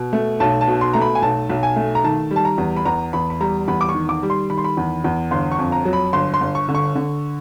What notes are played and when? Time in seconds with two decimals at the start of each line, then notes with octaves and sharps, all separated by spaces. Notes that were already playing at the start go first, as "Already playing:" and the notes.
Already playing: B2
0.13 A3
0.40 B1 A5
0.61 A5
0.67 B2
0.81 C6
0.93 A3 A#5
1.01 B5
1.15 G#5
1.22 B1 A5
1.49 B1
1.63 G#5
1.76 A3
1.95 A#5
2.04 D#3 A5
2.31 G3
2.36 A5
2.45 A#5
2.58 E2
2.76 B5
2.85 E2 A#5
3.13 E2 B5
3.30 B5
3.40 G3 A#5
3.68 E2 B5
3.81 D6
3.89 C#6
3.94 D#3
4.09 D6
4.23 G3
4.30 C6
4.50 D#3 B5
4.58 C6
4.64 B5
4.77 E2
5.04 E2
5.31 G1 C6
5.51 C#6
5.59 F2
5.72 A#5
5.85 F#3
5.93 B5
6.13 G1 C6
6.34 C6
6.41 G1
6.55 C#6
6.69 D3
6.75 C#6
6.95 D3